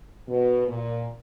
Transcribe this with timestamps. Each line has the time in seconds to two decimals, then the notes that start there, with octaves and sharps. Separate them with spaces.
0.28 B2
0.67 A#2